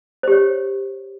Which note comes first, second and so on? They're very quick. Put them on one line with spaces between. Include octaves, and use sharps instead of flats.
C5 G4 C#5